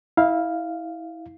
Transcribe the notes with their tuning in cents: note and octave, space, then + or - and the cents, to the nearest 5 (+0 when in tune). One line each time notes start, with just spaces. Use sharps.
E4 -25 F5 +0